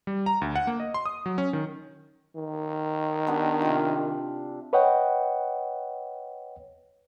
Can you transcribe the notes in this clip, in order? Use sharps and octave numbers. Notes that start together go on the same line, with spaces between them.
G3
A#5
D2
F#5
A#3
D#5
C6
D#6
F#3
C#4
D#3
D#3
B3 D4 G4
C3 F4
B4 C#5 D#5 F#5 G5